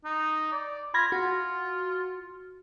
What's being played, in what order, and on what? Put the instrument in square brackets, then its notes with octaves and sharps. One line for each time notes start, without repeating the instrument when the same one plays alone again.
[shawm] D#4
D5
[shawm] F4 [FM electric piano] B5 G#6 A#6
[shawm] F4 [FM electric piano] F#4